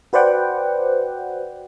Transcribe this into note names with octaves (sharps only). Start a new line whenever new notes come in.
F#4 B4 C5 D5 F#5 G5